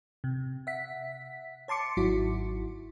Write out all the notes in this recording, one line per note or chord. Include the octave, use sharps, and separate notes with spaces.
C3
E5 F#5 B6
C#5 A5 C6 D6 C#7
G#1 F#3 E4 F#4